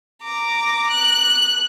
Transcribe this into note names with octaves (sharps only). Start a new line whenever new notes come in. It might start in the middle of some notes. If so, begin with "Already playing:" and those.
A#5 D6
F#6